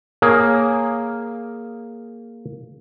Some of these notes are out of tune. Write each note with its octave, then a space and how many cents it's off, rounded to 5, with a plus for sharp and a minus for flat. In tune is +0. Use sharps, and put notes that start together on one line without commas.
A#3 +0 G#4 +0 C#5 +0